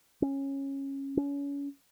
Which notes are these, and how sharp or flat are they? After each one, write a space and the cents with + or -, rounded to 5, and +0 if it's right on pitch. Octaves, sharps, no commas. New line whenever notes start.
C#4 -15
C#4 +30